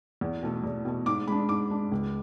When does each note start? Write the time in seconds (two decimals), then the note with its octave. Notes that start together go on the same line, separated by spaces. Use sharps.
0.21 E2
0.42 B2 A3
0.64 E2
0.85 B2 A3
1.06 G#2 D6
1.28 G#3 D4 B5
1.48 G#2 D6
1.70 G#3 D4
1.92 C#2